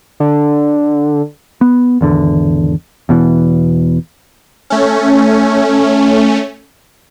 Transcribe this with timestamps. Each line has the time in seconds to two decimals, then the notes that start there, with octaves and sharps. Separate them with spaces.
0.20 D3
1.61 B3
2.01 G#1 E2 D3
3.09 E2 B2 E3
4.70 A3 C#4